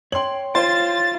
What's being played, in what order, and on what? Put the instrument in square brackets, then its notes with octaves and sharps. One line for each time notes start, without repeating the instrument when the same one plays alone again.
[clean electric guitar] C#5 G5 [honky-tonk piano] C6 F#7
[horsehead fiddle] F4 [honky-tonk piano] C5 [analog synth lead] A6